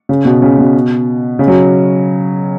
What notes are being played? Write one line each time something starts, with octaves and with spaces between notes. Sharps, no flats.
C#3
B2
C#3
B2
C#3
F#3